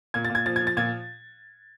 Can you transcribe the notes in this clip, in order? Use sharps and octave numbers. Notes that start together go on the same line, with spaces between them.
A#2 G#6
A6
A#2
G#6
F3 A6
F3 G#6
A6
A#2 G#6